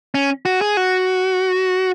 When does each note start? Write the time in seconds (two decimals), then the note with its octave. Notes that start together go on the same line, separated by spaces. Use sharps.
0.15 C#4
0.45 F#4
0.61 G#4
0.77 F#4